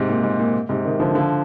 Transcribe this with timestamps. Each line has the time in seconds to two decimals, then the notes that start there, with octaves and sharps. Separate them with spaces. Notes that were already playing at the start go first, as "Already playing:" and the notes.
Already playing: G#2 C3
0.09 A#2
0.23 G#2
0.39 A#2
0.69 G#2 C3
0.84 C3 D#3
1.00 D3 F3
1.15 D3 F3